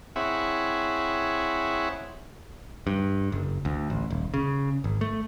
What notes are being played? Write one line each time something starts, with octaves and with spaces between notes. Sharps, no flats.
C4 E4 G#4 C#5 E5 F#5
G2
F#1
D2
A1
D#1
C#3
G#1
A3